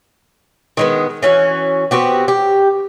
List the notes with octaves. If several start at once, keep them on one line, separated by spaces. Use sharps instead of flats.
D#3 G#3 B3
E3 C#4 F#4
B3 C4 F#4 G4
G4